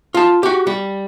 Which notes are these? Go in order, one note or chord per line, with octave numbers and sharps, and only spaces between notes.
F4 A5
F#4 G4
G3